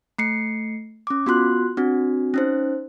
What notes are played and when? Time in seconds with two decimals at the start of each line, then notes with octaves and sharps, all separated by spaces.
0.18 A3 C7 C#7
1.07 C#4 D6
1.26 B3 F4 F#4 C6 F#6
1.77 C4 D4 F#4
2.34 C#4 D#4 C5